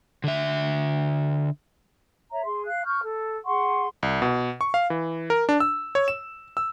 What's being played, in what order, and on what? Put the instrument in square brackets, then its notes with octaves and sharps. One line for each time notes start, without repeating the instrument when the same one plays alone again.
[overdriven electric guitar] D3 E5
[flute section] C#5 E5 A#5
G#4 C6
F5 F#6
C#6 F6 G6
A4
G#4 F#5 C6 C#6
[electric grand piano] C2
B2
C#6
F5
E3
A#4
D4
E6
C#5
E7
E6